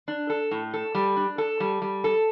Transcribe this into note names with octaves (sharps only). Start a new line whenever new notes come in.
D4
A4
A2
A4
G3
D4
A4
G3
G3
A4